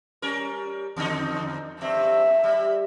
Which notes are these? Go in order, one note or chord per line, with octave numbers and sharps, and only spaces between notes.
G3 C#4 A#4
E2 D3 D#4
G2 C4 E5
G3